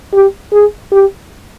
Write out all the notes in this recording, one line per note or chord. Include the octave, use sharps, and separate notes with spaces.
G4
G#4
G4